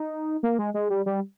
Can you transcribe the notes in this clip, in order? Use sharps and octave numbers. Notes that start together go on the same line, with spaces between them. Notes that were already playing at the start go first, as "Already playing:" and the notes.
Already playing: D#4
A#3
G#3
G#3
G3
G3